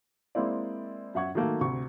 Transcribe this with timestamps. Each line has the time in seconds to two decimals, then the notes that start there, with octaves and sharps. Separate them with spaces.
0.35 G#3 A#3 C4 E4 D5
1.15 F#2 E5 F#5 C#6 G#6
1.35 D#3 F#3 A3 A#3
1.61 D2 C3 C#6